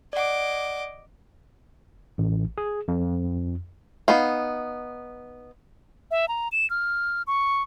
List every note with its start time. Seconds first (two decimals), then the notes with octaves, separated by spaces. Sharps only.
0.13 D5 D#5 F#5 D6
2.18 A1
2.58 G#4
2.88 F2
4.08 B3 D#4 F5
6.11 E5
6.28 A#5
6.52 E7
6.70 F6
7.27 C#6